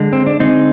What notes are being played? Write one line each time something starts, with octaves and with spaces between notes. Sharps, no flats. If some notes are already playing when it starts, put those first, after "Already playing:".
Already playing: D3 G#3
C4
D4
D3 G#3 C4 D#4